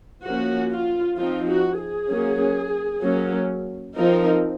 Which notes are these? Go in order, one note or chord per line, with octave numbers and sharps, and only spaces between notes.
F3 A#3 C#4 F#4
F4
F3 C4 D#4 F4
F#4
G#4
F#3 A#3 C#4
F#3 A#3 C#4
F3 C4 D#4 A#4